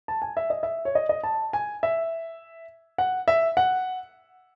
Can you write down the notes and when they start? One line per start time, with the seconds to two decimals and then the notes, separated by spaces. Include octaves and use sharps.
0.08 A5
0.22 G#5
0.37 E5
0.50 D#5
0.63 E5
0.85 C#5
0.95 D#5
1.09 D#5
1.24 A5
1.53 G#5
1.83 E5
2.98 F#5
3.28 E5
3.57 F#5